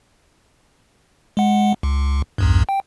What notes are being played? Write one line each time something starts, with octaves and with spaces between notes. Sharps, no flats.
G#3 F#5
C#2
B1 E2 G2
G5